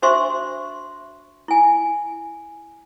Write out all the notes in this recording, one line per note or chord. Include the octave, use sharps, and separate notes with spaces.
D4 F#4 C5 E5 C6 C#6
E4 G#5